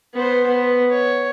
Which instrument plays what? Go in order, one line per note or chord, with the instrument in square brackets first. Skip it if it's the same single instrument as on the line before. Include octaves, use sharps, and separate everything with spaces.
[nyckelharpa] B3 C5
B3
C#5